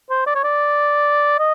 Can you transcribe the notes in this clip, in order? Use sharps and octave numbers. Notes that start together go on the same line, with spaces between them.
C5
D5
C#5
D5
D#5